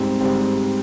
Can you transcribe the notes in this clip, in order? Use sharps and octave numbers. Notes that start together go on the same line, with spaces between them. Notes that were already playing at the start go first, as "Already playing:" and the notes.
Already playing: G#2 G3 C4
G#2 G3 C4